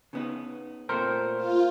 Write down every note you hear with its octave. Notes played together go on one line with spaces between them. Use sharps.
C#3 B3 D#4
A#2 A3 C4 A#4 C5
F4